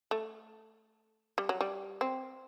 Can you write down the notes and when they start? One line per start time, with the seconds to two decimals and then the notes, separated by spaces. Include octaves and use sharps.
0.11 A3
1.38 G3
1.49 F#3
1.61 G3
2.01 C4